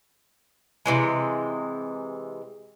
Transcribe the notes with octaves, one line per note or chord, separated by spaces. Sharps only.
C3 E3 G#3